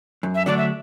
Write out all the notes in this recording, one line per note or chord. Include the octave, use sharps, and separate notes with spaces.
F#2
E5
D3 F#3 A3 D4 D5
E5